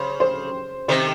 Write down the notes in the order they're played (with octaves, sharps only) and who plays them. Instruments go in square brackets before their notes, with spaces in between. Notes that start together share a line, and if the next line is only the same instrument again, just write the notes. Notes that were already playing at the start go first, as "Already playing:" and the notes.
Already playing: [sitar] C#3 [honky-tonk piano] C5
[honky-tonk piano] C5
[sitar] C3 D#3 [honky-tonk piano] C5